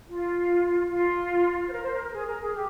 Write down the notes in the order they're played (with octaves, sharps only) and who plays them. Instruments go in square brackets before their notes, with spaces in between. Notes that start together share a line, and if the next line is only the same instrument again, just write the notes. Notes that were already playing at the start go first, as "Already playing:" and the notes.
[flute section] F4
F4
C5
A#4
C5
A#4
A#4
G#4
A#4
G#4
G4